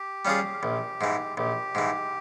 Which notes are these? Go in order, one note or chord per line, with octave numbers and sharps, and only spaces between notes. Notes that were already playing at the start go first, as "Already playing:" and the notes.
Already playing: G4
G3 C#4 F4 G#4
A#1
G#2 E3
A#1 G4
G#2 E3